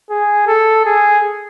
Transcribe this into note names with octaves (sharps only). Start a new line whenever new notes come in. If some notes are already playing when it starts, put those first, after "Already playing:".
G#4
A4
G#4